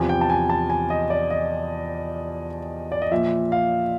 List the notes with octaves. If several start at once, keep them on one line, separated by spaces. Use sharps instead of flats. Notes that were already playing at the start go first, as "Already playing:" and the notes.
Already playing: E2 C3 F3 G#5
G5
A5
G#5
A5
G#5
D#5
D5
D#5
D5
D#5
A#2 F3 E5
F5